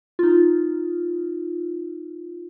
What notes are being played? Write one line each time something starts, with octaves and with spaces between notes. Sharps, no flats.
D#4 F4